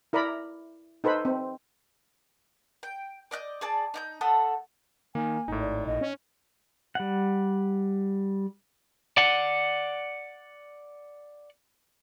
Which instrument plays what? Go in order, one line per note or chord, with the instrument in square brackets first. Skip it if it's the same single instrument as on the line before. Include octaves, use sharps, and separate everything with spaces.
[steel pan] E4 A#4 D5 A#5 B5
D#4 A4 B4 C5 B5
C4
[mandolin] G5
D5 D#5 F#6 G6
G#4 D5 A5
D#4 D6 G6
A3 A4 F#5 D#6
[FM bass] D#3 [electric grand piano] A#3 [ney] G#5
[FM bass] G#1 [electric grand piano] A2 D#4
[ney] D5
[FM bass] A#1 [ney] D#5
[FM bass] C#4
[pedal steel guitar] G3 F#5
[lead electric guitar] D5 F#5